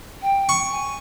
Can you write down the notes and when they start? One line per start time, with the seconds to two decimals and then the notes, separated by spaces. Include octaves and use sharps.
0.22 G5
0.49 C#6
0.71 G#5